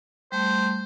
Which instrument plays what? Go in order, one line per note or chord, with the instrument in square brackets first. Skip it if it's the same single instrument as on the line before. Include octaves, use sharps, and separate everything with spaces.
[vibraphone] G3 A3 [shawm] C5